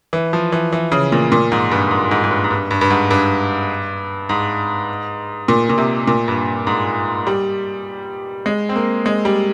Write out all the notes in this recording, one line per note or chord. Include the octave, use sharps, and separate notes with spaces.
E3
F3
E3
E3
C#3
A#2
A#2
G#2
G2
G#2
G#2
G#2
G2
G#2
G2
G2
G2
G#2
G2
G#2
A#2
A#2
C3
A#2
G2
G#2
G3
G#3
C4
A#3
G#3
G3